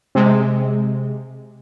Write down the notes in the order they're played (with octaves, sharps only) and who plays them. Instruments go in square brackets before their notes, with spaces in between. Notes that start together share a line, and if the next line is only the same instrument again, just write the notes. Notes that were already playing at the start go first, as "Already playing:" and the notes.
[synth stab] C3 G#3